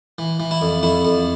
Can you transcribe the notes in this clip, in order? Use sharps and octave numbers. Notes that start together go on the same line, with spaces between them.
E3
E3
E4
F2
F2 E4
F2